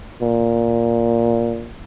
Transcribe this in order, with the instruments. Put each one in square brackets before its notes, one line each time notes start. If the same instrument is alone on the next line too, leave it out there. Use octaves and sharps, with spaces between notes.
[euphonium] A#2